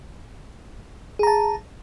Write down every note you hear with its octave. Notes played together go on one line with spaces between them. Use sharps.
G#4 A5 A#5